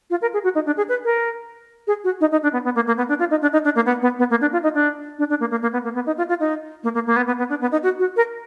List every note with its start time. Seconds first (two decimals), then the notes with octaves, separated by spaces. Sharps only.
0.10 F4
0.22 A#4
0.33 G#4
0.44 F#4
0.55 D#4
0.66 D4
0.77 G#4
0.89 B4
1.04 A#4
1.87 G#4
2.04 F#4
2.21 D#4
2.32 D#4
2.43 D4
2.53 B3
2.64 B3
2.75 A#3
2.87 A#3
2.97 B3
3.08 D4
3.19 F4
3.31 D#4
3.42 D4
3.53 D#4
3.64 D4
3.75 A#3
3.86 B3
4.02 B3
4.19 B3
4.30 A#3
4.41 D4
4.53 F4
4.63 D#4
4.74 D4
5.19 D4
5.29 D4
5.40 A#3
5.51 A#3
5.62 A#3
5.73 B3
5.84 A#3
5.95 B3
6.06 D#4
6.18 F4
6.29 F4
6.40 D#4
6.83 A#3
6.94 A#3
7.06 A#3
7.16 B3
7.27 B3
7.38 B3
7.50 D4
7.61 B3
7.72 D#4
7.83 F#4
7.99 F#4
8.16 A#4